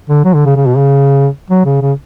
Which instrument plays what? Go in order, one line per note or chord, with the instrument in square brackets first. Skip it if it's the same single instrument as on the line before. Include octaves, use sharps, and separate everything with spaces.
[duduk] D3
F#3
D3
C#3
C#3
B2
C#3
F#3
C#3
C#3